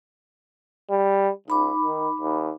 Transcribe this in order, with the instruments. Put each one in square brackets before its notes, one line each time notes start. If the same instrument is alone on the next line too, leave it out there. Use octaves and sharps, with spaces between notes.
[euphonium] G3
[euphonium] C#2 [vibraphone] D#4 B5 D6
[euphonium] D#3
D#2